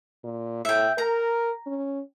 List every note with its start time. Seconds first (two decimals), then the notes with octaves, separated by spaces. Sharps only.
0.24 A#2
0.65 A2 E5 G5
0.98 A#4 A#5
1.66 C#4